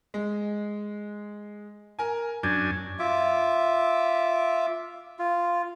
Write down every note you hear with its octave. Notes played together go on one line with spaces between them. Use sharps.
G#3
A#4 G#5
F#2 D4 G#5 G6
F4 E5 D6
F4